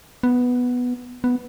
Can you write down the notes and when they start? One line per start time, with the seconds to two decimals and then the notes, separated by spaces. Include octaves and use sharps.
0.23 B3
1.24 B3